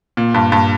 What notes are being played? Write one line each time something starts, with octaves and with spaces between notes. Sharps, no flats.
A#2
G2
G2